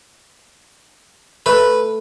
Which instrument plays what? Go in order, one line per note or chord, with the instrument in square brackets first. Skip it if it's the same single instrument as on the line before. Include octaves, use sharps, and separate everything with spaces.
[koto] A3 [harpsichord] B4